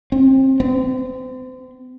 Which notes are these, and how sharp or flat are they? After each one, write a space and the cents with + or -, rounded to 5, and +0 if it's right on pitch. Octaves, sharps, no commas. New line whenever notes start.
C4 +25
C4 -35